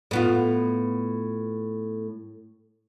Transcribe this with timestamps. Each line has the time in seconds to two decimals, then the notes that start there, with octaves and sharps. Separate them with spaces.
0.11 A2 B3 F4